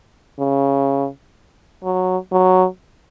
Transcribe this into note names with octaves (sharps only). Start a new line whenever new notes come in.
C#3
F#3
F#3